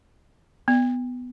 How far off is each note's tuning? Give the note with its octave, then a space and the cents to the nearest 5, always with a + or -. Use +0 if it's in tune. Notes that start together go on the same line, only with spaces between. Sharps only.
B3 +10